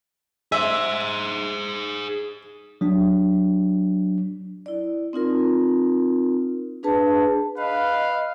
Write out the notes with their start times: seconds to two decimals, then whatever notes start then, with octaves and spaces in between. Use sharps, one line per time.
0.52 G#4 C5 E5
2.81 F#3 D4
4.66 E4 D5
5.13 C4 D#4 F4 A#4
6.83 D4 G#4 B4 A5
7.58 B4 D#5 F5